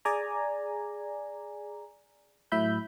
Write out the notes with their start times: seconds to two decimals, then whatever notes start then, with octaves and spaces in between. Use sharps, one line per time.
0.05 G#4 D5 G#5 A#5
2.52 A2 F#3 E4 E5 B5 G6